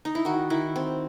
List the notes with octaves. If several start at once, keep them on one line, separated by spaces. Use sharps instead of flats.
D#4
E4
D#3 F#4
D#3 E4
C4